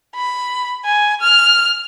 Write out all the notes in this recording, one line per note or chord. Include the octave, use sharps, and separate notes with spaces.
B5
G#5
F6